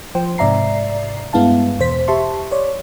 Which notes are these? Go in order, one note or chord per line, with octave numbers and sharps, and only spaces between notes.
F3 C5 G5
G#2 C3 D5 E5 A#5 C7
G2 G#3 B3 E4 F5 A5
E2 B2 C5 B6
G4 E5 A5 C6 C#6
C#5 D5